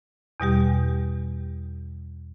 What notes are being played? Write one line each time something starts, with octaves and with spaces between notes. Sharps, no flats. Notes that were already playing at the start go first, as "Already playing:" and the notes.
E2 B2 G3 G4